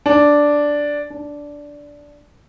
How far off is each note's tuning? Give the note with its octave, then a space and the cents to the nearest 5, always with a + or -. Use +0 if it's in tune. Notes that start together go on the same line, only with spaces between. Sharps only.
D4 -5
D4 -10